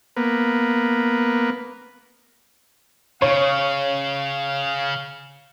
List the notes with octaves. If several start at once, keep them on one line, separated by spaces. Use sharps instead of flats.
A#3 B3
C#3 C#5 F5